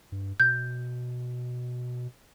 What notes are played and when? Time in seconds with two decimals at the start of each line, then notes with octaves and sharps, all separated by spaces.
0.12 G2
0.40 B2 G6